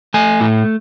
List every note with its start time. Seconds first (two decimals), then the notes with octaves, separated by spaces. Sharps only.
0.14 A3 G#5
0.40 A2